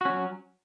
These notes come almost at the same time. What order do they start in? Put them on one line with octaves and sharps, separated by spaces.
F#4 C#4 F#3